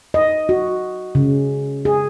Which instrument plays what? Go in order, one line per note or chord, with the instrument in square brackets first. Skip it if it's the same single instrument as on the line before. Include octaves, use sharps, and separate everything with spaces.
[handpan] D#5
F#4
C#3
G#4